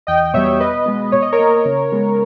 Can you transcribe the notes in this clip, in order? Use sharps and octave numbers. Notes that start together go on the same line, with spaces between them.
E2 D#5 G5
B2 G3 B3 C#5 E5
B2 B4 D#5
G#3 B3
B2 C#5
D#5
A#4 C#5
A#3
C#3
G#3 B3